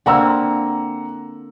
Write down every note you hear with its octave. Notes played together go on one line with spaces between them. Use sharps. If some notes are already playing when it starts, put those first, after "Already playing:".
D3 A#3 C4 F#5 A#5 E6